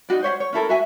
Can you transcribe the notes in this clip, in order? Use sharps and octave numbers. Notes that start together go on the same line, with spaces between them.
D#4 F4 F#4 D5
C5 C#5 E5 F#5
C#5
C#4 E4 A4 A#4
F#4 E5 G#5